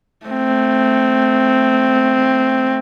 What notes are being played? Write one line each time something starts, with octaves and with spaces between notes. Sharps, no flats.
A3 C4